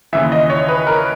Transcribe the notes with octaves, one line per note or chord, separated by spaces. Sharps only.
D#2 C#3 E3 E5
D#5
C#5
B4
A#4